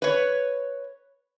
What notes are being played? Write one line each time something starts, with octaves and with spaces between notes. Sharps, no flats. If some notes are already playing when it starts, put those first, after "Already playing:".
B4 C#5